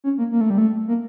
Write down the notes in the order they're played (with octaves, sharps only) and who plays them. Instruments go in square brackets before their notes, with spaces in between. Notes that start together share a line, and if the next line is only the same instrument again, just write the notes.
[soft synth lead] C#4
A#3
A#3
A3
G3
A3
A#3